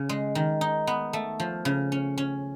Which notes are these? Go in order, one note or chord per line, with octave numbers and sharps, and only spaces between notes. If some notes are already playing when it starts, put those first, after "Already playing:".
Already playing: C#3
G#3
D#3
D#4
B3
A3
F3
C#3
C#4
C#4